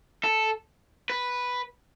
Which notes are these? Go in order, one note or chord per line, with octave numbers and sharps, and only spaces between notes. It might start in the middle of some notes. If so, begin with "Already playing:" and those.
A4
B4